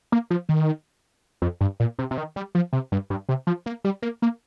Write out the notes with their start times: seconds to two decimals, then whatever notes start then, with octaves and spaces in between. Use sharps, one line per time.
0.12 A#3
0.30 F3
0.49 D#3
1.42 F2
1.61 G2
1.80 A#2
1.99 C3
2.11 C3
2.18 D#3
2.36 G3
2.55 F3
2.73 C3
2.92 G2
3.10 G2
3.29 C3
3.47 F3
3.66 A#3
3.84 G3
4.02 A#3
4.22 A#3